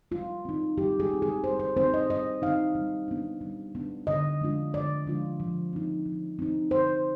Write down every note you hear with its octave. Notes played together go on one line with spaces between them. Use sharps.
G3 F4
C4 D#4
G3 G4
G#4
C4 D#4
G#4
G3 C5
C5
C4 D#4 C5
D#5
G3 D#5
C4 D#4 F5
G3
B3 D4
G3
B3 D4
D3 D#5
F3 G#3 D4 F4
D3 D5
F3 G#3 D4 F4
F3
C4 D#4
F3
C4 D#4
D3 C5